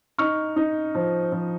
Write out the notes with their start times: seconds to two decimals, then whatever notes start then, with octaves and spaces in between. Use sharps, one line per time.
0.18 D#4 C#6 F6
0.56 D#4
0.95 F3
1.32 F3